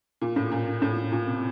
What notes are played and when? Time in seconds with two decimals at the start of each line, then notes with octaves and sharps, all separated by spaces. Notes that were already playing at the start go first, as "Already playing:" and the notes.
0.21 A#2
0.36 A2
0.52 A#2
0.82 A2
1.12 A#2
1.27 C3